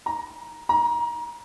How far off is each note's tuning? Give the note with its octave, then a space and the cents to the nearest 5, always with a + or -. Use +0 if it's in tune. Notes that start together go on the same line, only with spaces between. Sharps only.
A#5 +5
A#5 +25